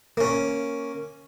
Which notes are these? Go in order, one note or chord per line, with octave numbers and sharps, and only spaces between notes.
A#3 C#4